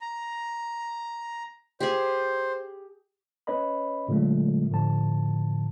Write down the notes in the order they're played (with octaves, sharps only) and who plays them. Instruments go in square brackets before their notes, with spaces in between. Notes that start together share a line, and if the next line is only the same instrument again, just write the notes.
[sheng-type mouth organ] A#5
[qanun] G4 G#4 [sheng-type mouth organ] C5
[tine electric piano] C#4 B4 C#5 D#5 B5
A#2 D3 F#3 G#3 A3
A2 D3 F3 A5